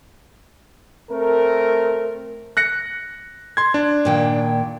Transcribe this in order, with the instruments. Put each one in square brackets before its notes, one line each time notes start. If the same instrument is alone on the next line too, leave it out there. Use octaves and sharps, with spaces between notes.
[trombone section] A3 C4 A#4
[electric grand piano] F#6 A#6 C#7
C6 G#6
D4
[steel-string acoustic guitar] A#2 D#3 G5